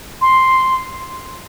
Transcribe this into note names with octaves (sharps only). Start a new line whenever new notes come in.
C6